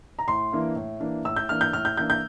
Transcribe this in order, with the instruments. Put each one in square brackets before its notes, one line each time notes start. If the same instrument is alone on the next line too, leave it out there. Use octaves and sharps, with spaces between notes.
[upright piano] A#5
A2 C6
E3 A#3 D4
A2
E3 A#3 D4
A2 E6
G6
E3 A#3 D4 F6
G6
A2 F6
G6
E3 A#3 D4 G6
G6